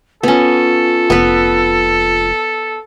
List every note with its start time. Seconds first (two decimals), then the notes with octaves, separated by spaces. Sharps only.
0.23 B3 C#4 F4 A4
1.10 F1 B3 B4